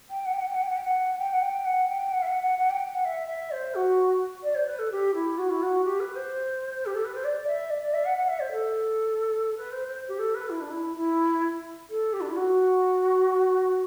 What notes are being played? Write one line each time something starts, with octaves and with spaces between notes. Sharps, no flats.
G5
F#5
G5
F#5
G5
F#5
G5
F#5
G5
F#5
G5
F#5
G5
F#5
G5
F#5
E5
F#5
F#5
F#5
G5
F#5
E5
E5
C5
F#4
D5
C5
B4
A4
G4
E4
F#4
E4
F#4
G4
B4
C5
G4
A4
B4
C5
D5
E5
D5
D5
E5
F#5
F#5
E5
C5
A4
B4
C5
C5
G4
A4
B4
E4
D4
E4
E4
A4
G4
D4
E4
F#4